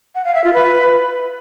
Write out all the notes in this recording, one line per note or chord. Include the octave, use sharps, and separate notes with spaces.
F#5
F5
E5
F4
B4